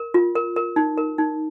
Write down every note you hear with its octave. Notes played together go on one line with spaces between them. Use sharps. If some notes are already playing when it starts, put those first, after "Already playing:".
Already playing: A#4
F4
A#4
A#4
D#4
A#4
D#4